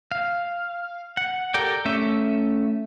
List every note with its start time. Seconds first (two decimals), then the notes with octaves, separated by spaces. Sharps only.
0.11 F5
1.17 F#5
1.54 G4 A4 A#4 D5 G5
1.85 A3 C#4 E5